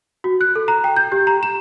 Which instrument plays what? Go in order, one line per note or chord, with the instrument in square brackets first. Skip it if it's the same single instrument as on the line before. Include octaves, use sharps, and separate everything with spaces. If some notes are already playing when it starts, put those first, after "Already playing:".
[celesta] F#4
F#6
A4
A#5
G5
G6
G4
A#5
E7